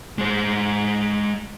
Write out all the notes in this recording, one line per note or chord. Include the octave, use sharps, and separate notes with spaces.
G#3 C5